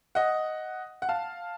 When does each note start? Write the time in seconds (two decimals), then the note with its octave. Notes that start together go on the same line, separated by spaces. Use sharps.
0.15 D#5 F#5
1.02 F#5
1.09 F5 A5